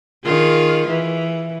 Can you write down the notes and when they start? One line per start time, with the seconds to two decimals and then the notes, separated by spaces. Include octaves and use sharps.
0.25 D#3 F4 G#4
0.87 E3